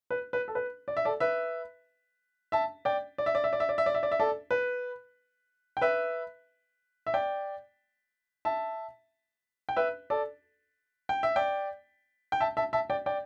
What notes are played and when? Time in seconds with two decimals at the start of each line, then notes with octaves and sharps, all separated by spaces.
0.11 B4
0.33 B4
0.48 A4
0.55 B4
0.88 D5
0.97 E5
1.05 A4 D5
1.20 B4 E5
2.52 E5 A5
2.85 D5 G5
3.18 D5
3.26 E5
3.35 D5
3.44 E5
3.53 D5
3.60 E5
3.69 D5
3.78 E5
3.86 D5
3.95 E5
4.03 D5
4.12 E5
4.20 A4 D5
4.51 B4
5.77 G5
5.81 B4 E5
7.07 E5
7.14 D5 G5
8.45 E5 A5
9.69 G5
9.76 B4 E5
10.10 A4 D5
11.09 G5
11.23 E5
11.36 D5 G5
12.32 G5
12.40 E5 A5
12.57 E5 A5
12.73 E5 A5
12.90 D5 G5
13.06 D5 G5